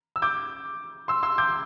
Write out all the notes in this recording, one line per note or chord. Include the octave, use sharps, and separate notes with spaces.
E6
D6 G6
C6 E6
C6 E6
D6 G6